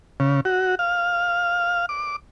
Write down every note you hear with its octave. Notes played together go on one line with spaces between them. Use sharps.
C#3
F#4
F5
D6